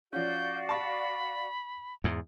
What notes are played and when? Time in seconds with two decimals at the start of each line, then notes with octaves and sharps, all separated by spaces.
0.13 F3 C#4 F#4 D5 F5 G6
0.69 A5 B5 C#6
2.04 E2 G#2